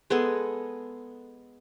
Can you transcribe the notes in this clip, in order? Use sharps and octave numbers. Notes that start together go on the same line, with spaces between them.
G#3 B3 G#4 A4